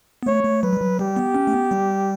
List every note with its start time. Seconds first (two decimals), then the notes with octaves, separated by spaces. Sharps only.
0.23 B3
0.26 A3 C#5
0.44 A3
0.63 F#3 B4
0.73 G3
0.81 F#3
0.99 G3 G4
1.16 B3
1.35 C#4
1.47 A3
1.53 B3
1.71 G3